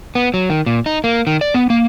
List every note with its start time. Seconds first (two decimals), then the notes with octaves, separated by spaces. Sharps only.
0.15 B3
0.34 F#3
0.50 D#3
0.66 A#2
0.86 D#4
1.04 A#3
1.27 D#3
1.41 D5
1.54 B3
1.70 A#3